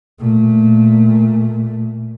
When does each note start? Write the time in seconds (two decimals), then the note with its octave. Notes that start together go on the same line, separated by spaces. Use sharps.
0.19 A#2 A3